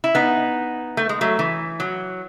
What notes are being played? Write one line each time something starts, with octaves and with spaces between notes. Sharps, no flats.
E4
B3 D#4
A3
G#3
F#3 A3
E3
F#3